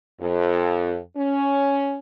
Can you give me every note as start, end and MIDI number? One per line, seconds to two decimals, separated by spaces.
0.20 0.97 41
1.17 1.98 61